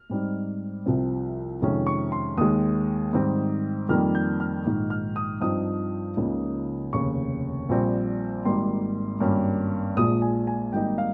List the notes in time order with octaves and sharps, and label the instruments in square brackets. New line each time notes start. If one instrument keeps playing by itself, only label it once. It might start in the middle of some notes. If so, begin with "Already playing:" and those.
Already playing: [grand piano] F6
G#2 G3 C4 D#4
C2 C3 F3 C4
F2 C3 D#3 G#3 C#4
C#6
C6
D#2 D#3 G#3 D#6
G#2 D#3 G3 C4
F2 D#3 G3 A#3 F6
G6
F6
A#1 G#2 D#3
F6
D#6
G2 F3 C4 D#4 D#6
C#2 C#3 F3 A#3 D#4
F1 D#2 C#3 C#6
A#1 A#2 G3 C4
G#1 G#2 G3 A#3 C6
G#1 G2 G3 A#3 C#4
A#1 A#2 F3 G#3 D#6
G#5
G#5
G#1 G#2 G3 A#3 D#4 G5
F5